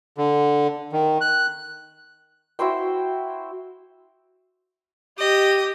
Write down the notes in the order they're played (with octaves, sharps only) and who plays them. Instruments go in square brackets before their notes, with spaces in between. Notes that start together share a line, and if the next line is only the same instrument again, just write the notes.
[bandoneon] D3
D#3
F#6
[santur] E4 F#4 C5 G5
[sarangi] G4 [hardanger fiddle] D#5